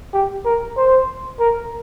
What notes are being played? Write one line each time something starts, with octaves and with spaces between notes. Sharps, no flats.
G4
A#4
C5
A#4